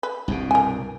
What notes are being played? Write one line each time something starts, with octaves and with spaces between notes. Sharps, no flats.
B4
C2 G2 B2
A#4 G#5